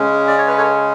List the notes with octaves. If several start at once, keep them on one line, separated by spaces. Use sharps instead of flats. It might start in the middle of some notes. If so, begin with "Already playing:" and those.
Already playing: C#3 G#3 C#4
D5
C#5
B4
A4 C#5